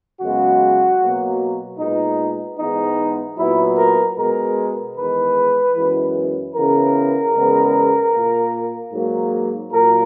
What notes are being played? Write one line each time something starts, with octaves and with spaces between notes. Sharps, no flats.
F#2 C#3 G#3 B3 F#4
B2 F#3 A#3
A#2 G#3 B3 D#4
G#2 E3 G#3 B3 D#4
A#2 F#3 B3 E4
A#4
B2 G#3 B3 A#4
E2 D#3 G#3 B4
F#2 E3 G#3 B3
C#3 E3 B3 A#4
E2 C#3 G#3 B3
A#2 A#3
G#2 F#3 A#3
A#2 F#3 A#3 A#4